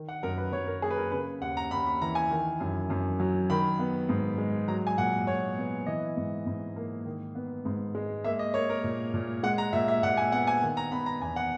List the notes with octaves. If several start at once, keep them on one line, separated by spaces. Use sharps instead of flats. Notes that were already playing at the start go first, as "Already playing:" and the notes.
Already playing: D#3
F#5
F#2 A#4
B4
F#2 C#5
A#4
A#3 G#4
B4
A#4
C#3 B4
D#2 F#5
A#5
D#2 B5
B5
E3 A#5
G#5
D#3
F#2
F#2
F#3
D#3 B5
B3
G#2
G#3
F#3 A#5
G#5
A#2 F#5
A#2 C#5
B3
E3 D#5
G#2
G#2
A#3
D#3
B3
G#2
G#3
A#3 E5
D#5
A#3 C#5
A#4
A#2
A#2
G#3 F#5
A#5
A#2 E5
E5
A#2 F#5
G#5
B3 F#5
G#5
D#3
A#5
B3 B5
A#5
E2 G#5
F#5